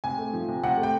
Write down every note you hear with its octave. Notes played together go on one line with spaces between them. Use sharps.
C3 G#5
A3
F3
C3
C3 F#5
A3
G5